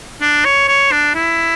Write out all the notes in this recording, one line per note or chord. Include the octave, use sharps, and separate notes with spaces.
D4
C#5
C#5
D4
E4